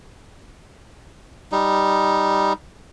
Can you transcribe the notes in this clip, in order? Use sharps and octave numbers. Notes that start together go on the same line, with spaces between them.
G3 D#4